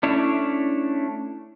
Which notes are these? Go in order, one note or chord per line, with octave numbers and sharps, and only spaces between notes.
A3 C#4 D4 E4 C#5